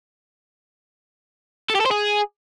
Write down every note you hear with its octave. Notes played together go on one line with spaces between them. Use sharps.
A4
G4
A4
C5
G#4